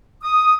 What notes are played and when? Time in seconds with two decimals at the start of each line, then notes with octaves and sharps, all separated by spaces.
0.23 D#6